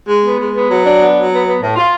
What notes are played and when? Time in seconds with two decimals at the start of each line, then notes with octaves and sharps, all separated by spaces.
0.08 G#3
0.23 B3
0.37 G#3
0.53 B3
0.68 F#3
0.83 D4
1.00 B3
1.15 F#3
1.30 B3
1.44 B3
1.60 A2
1.75 F4